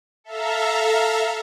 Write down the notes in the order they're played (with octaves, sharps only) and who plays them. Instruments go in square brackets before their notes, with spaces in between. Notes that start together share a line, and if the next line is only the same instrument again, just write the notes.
[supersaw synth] A4 E5 F5 A#5